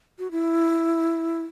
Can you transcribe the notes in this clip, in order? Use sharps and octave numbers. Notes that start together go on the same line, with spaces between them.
F#4
E4